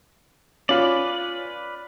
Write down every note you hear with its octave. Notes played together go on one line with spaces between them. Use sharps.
C#4 F4 B4 D5